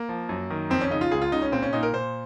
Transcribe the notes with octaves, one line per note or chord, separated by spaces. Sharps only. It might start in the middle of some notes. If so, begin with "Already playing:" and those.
Already playing: A#3
F3
F#2
D#3
F2 C4
C#4
C#3 D#4
F4
C#2 G#4
F4
C#3 D#4
C#4
A#2 C4
C#4
A#2 D#4
A#4
A#2 C5